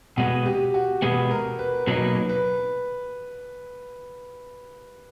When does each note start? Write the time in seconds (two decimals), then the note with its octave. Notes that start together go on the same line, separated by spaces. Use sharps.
0.17 B2 G#3 B3 F#4
0.46 G4
0.74 F#4
1.02 B2 G#3 B3 F#4
1.31 A#4
1.59 B4
1.87 B2 F#3 A#3 D#4 B4
2.29 B4